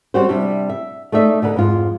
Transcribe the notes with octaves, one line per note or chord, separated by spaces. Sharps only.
G3 C4 C#4 F#4 G4 C5
C3 G3 D4 E4
E5
A3 D#4 D5 E5
B2 D3 D#4 B4
F2 G#2 F4